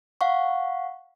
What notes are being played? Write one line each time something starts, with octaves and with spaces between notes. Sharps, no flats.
F5 F#5 C#6